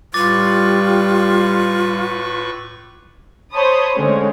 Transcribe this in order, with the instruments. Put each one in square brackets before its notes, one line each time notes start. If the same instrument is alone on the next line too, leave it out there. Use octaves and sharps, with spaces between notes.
[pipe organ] A2 B4 C#6 [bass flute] G3 [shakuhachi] F4 [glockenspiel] D6 A6
[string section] C5 C#5 A5 B5 D#6
D3 G#3 A3 C4 C#4